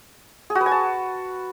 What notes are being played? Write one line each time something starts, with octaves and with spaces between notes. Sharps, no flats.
G#4
F#4
B4
G#5
A5